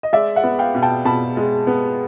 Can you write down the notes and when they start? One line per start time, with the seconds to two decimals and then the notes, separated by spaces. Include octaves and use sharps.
0.03 D#5
0.13 G#3 D5 E5
0.36 E5 F#5
0.44 B3
0.59 F5 G5
0.75 B2
0.82 G5 A5
1.05 B2 A5 B5
1.37 G#3
1.67 B3